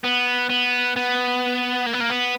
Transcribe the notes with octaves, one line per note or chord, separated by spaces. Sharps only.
B3
B3
B3
A#3
B3
A#3
B3